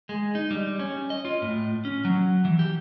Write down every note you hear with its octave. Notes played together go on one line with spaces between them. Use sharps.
G#3
D#4
G3
C#4
D#5
F4
A2
C#4
F#3
E3
G4